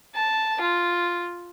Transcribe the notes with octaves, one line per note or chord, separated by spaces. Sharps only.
A5
F4